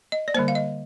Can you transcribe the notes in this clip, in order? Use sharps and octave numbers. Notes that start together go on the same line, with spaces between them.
D#5
D5
D3 G3 A#3 C5
F5
D#5